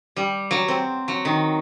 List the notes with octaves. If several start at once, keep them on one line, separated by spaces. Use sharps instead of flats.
G3
F#3
C4
F#3
D#3